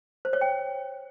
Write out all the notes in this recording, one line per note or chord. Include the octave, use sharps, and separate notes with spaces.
C5
C#5
G5